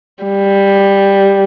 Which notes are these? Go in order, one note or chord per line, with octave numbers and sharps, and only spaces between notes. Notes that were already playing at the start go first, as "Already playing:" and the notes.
G3